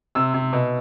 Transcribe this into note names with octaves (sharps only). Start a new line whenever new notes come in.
C3 E6
C3
B2